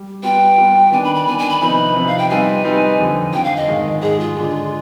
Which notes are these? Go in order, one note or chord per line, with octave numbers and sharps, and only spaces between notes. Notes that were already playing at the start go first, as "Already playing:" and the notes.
Already playing: G3 G4
G3 B3 F4 B4 G5
G3 B3 F4 B4
D#3 B3 D4 G#5
B5
B5
D#3 B3 D4 G#5
G#5
B5
C3 F3 B3 D#4 B4 B5
C3 F3 B3 D#4 B4
F5
G5
G3 C4 D#4 B4 G#5
G3 C4 D#4 B4
F2 D3 F3
F2 D3 F3 G5
F5
D#5
G#2 D#3 G#3
G#2 D#3 G#3 G#4
F4
D3 G#3 D4 G#4